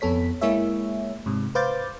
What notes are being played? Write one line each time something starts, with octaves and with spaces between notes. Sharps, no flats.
F2 B3 A4 C#5 B6
G#3 A#3 E4 G#4 C#5 E5
G#2 C3
B4 C5 F5 D6 G6 A6